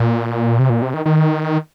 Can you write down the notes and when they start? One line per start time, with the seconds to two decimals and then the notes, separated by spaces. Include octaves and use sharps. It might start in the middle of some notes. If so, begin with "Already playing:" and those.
Already playing: A#2
0.59 C3
0.70 A#2
0.82 C3
0.94 D#3
1.06 D#3